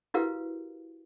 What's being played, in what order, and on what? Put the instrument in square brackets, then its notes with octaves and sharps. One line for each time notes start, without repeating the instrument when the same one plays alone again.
[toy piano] E4 F#4 G4 A#4 B4 F5